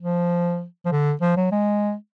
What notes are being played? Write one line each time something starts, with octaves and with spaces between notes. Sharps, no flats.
F3
F3
D3
F3
F#3
G#3